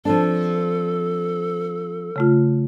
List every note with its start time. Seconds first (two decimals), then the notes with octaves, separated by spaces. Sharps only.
0.05 F3 C4 D4 A4 A5
2.16 C#3 A3 F4